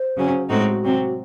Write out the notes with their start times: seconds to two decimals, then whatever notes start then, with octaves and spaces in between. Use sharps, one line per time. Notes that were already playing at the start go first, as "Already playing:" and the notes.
Already playing: C5
0.17 C#3 F#3 C#4
0.50 A2 G#3 C4 D#4 F#4 A4
0.61 G#4
0.72 F#4
0.84 C3 F#3 C4